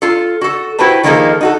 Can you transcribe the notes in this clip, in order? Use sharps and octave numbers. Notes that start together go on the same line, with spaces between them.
F4 A4
F#4 A4
E4 F#4 G4 B4 C5 A5
D#3 F3 G#3 A#3 D#4 A4
D#4 F#4 A4